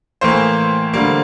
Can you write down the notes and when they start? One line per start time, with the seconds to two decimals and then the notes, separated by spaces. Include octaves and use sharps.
0.21 A2 E3 A#3 C5
0.94 D3 G3 A#3